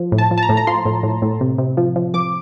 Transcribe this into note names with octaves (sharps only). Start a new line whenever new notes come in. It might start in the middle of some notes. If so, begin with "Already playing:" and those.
Already playing: F3
A2
A5
F3
A5
A#5
A2
A#5
F3 C6
A2
A2
A2
C3
C3
F3
F3
F3 D6